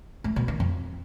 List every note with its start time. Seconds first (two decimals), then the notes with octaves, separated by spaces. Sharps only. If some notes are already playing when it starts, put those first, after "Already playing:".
0.24 A3
0.36 B2
0.48 D#3
0.60 F2